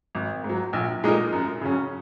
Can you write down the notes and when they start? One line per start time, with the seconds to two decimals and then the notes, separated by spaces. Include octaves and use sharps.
0.15 G#1
0.44 G#2
0.49 F#3
0.73 A#1
1.03 A#2 G#3 D#4 A#4
1.33 F#2
1.61 C#3 F#3 C#4